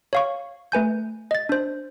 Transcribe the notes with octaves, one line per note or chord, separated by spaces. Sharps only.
C#5 F5 C#6
A3 B4 G#5 G6
D#5 A6
D4 C5